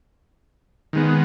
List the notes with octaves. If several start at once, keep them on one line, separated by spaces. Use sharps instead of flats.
D#3 G#3 B3